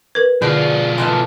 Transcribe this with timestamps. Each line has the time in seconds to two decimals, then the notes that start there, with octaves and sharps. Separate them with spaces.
0.15 A#4 B4
0.42 B2 D3 F4 G#4 D5
0.98 E3 D#4 A4 C6